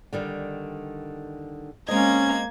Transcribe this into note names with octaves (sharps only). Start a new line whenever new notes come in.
D3 D#3 G3
G#3 A#3 C4 C#4 D#5 G#6